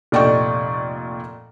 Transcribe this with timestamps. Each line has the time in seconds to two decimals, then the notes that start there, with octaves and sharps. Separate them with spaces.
0.12 F1 A#2 D5 D#5 G5 C#6